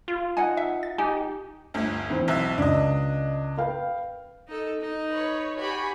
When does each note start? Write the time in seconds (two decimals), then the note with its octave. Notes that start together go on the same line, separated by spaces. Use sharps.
0.08 F4
0.37 D#4 F#5 G#5
0.57 E5
0.83 A6
0.98 D#4 G4 G#5
1.74 G1 D2
2.10 E3 C4
2.28 B1 E5 F#6
2.58 C#2 D4 D#5
3.57 B4 F5 G5
4.48 D#4 A4
4.80 D#4
5.11 B4 C#5
5.59 F#4 G4 G#5 B5